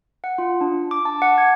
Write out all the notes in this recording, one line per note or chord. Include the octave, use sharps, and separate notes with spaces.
F#5
F4
D4
D6
A5
F#5
G#6